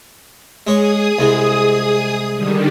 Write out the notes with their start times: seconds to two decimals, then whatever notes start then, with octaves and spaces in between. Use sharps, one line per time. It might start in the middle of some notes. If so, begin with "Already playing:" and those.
0.67 G#3 G#4 C#5 D#6
1.19 C2 G#3
2.34 D3 D#3 G3